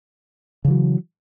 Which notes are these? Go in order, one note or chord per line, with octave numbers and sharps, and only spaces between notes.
C#3 E3 F#3